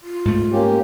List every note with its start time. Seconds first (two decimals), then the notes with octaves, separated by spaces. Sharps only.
0.02 F4
0.25 G#2 A3
0.52 A#3 C#4 G4